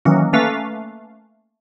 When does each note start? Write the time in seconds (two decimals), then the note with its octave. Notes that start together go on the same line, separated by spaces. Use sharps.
0.05 D#3 E3 F#3 A#3 C#4
0.33 A3 A#3 C#4 A4 B4 F5